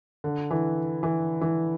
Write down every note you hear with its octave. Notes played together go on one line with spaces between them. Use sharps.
D3
E3
E3
E3